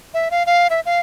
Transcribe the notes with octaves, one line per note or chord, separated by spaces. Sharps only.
E5
F5
F5
E5
F5